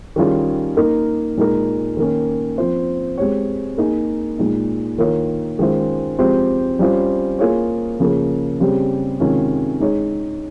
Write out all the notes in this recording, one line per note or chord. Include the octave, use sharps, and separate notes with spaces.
D#3 G3 C#4 F4 G#4
A#3 D#4 A#4
A#2 G#3 D#4 A#4
D#3 A#3 C#4
F3 C4 F4 C5
G#3 C4 G4 C#5
A#3 D#4 G#4
A#2 G#3 D#4
D#3 A#3 F4 A#4 C#5
D#3 G#3 C#4 F4 C5
F3 G#3 C4 G4 C5
G3 C#4 F4 C5
A#3 F4 G#4 C#5
C#3 F3 A#3
C#3 G3 C4 G4
C3 D#3 G#3 C#4 F4
G#3 D#4 G#4 C#5